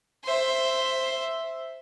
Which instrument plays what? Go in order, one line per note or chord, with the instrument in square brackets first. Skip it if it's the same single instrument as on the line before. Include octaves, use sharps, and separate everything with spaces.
[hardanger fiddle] C5 E5